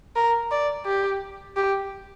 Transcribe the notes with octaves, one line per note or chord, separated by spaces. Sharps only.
A#4
D5
G4
G4